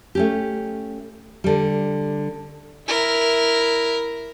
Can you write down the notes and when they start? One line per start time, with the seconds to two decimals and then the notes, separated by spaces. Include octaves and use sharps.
0.15 A3 C#4 G4
1.44 D3 G3
2.88 E4 A#4